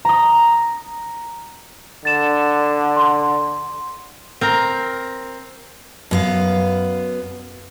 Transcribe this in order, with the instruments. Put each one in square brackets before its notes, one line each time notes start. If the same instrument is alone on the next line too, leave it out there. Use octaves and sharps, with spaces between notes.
[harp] A#5 D#6
[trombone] D3 [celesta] A6 E7
[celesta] C6
[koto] C4 A#4 A#5
[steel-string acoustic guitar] F#2 B3 F5